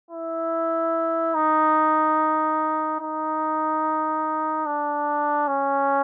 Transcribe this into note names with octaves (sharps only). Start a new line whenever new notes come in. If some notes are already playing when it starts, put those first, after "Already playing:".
E4
D#4
D#4
D4
C#4